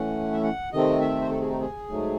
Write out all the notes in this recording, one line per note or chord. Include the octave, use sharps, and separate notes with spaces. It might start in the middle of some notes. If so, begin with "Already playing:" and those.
Already playing: A2 E3 A3 C#4 F#5
E5
F#5
C3 D#3 A3 C4 D#5
E5
C5
A4
G#4
D#4
G#4
G#2 F#3 A3